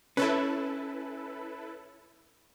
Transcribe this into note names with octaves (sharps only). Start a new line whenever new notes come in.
C#4 E4 A4 B4